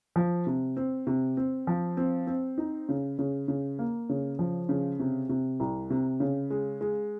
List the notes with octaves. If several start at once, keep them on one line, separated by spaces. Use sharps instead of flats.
F3
C3
C4
C3
C4
F3
C4
C4
D#4
C#3
C#3
C#3
A#3
C#3
F3
C#3
C3
C3
C2
C3
C#3
G#3
G#3